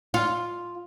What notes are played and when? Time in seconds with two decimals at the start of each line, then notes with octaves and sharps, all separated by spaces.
0.14 F4